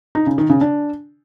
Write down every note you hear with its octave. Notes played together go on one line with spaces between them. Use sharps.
D#4
C#3
D#3
C#3
D4